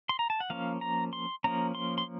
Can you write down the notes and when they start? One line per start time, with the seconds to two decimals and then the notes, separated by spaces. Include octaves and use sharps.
0.09 C6
0.19 A#5
0.30 A5
0.40 F#5
0.50 F3 A#3 C#4 F5
0.81 A#5
1.13 C6
1.44 F3 A#3 C#4 A#5
1.75 C6
1.98 C6